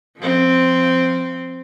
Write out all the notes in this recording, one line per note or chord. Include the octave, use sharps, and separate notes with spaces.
F3 C4